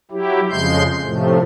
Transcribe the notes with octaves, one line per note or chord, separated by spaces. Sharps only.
F#3 E4 G4
F2 C#3 F3 G#3 C6 G6
A2 C3 F3 A3